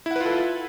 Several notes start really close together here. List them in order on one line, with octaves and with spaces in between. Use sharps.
E4 F#5 B4 F4 A4